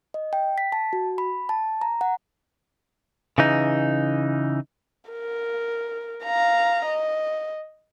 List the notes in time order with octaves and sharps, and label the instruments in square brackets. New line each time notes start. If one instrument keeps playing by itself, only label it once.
[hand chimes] D#5
G5
B6
A5
F#4
B5
A5
A#5
F#5
[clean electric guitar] C#3 E3 D#4
[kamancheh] A#4
F5 A#5
D#5